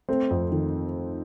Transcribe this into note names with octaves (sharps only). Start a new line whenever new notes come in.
A3 C4
F2
D#3